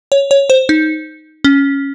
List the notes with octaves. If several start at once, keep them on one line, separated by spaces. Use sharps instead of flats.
C#5
C#5
C5
D#4
C#4